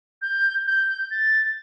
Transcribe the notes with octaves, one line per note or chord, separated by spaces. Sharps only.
G6
G6
A6